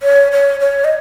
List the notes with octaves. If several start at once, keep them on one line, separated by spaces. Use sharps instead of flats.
C#5
C#5
C#5
D#5